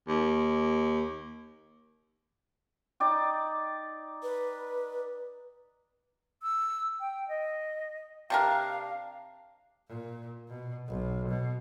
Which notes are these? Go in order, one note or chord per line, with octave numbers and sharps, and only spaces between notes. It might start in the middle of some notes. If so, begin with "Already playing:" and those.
D#2
D#4 D5 G5
B4
E6
G5
D#5
C3 D4 A#4 F5
A#2
B2
B1
B2